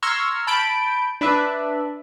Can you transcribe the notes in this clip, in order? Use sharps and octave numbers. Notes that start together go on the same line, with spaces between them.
A#5 C6 C#6 E6 F6 G#6
A5 B5 G6 D7
D4 B4 D5 E5